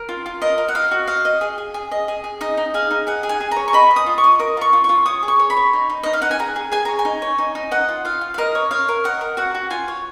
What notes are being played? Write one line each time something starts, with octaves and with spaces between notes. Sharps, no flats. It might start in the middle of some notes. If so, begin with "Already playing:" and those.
Already playing: A#4
F4
F4
A#4 D#5
A#4
F#5
D#5 F5
F#4
D#5 F5
D#5
G#4
G#4
G#4
D#5
G#4
G#4
D#4 D#5
D#4
G#4 F5
D#4
G#4 F#5
G#4
G#5
G#4
C#5 A#5
C#6
D#5 B5
D#5
D#6
F4
C#6
D#5
A#4 D#6
F4 C#6
F4
F4 C#6
C#5 D#6
G#4
C#6
C#5
B5
C#5
D#4
D#4
D#4 D#5
F5
D#4 F#5
G#5
G#4 A#5
G#4
G#4 G#5
C#5 A#5
G#5
D#4
C#5
D#4
D#4
D#5 F#5
F4
F4 F5
F4
F5
A#4 D#5
C#5
C#5 F5
A#4
D#5 F#5
A#4
F#4 F#5
F#4
F4 G#5
C#5